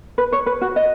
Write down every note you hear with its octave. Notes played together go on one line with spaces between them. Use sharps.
B4
C#5
B4
F#4
D#5